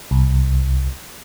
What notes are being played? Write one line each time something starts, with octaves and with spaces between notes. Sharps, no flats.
C2